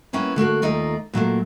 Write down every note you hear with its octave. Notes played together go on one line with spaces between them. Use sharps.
G3 A#3 B3 C#4 E4
D3 A3 A#3 F#4
D#2 A3 D#4 F4 D5
A#2 F#3 A3 A#3